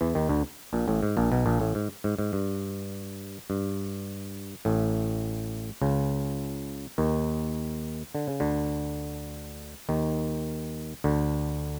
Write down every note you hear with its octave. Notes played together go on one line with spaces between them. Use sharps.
E2 E3
D#2 D#3
D2 D3
A#1 A#2
A1 A2
G#2
A#1 A#2
B1 B2
A#1 A#2
A1 A2
G#2
G#2
G#2
G2
G2
A1 A2
C#2 C#3
D#2 D#3
D3
C#3
D2 D3
D#2 D#3
D2 D3